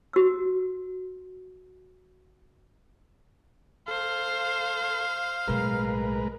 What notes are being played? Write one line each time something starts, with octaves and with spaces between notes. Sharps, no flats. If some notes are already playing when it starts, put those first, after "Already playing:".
F#4 E6
A4 C5 F5
B1 A2 G#3 A#4 B4